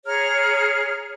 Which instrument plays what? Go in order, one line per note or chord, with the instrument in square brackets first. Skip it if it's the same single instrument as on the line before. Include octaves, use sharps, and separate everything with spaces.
[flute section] G#4 C#5 A#5 F6